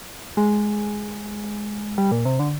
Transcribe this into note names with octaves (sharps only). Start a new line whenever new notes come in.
G#3
G3
A#2
C3
D3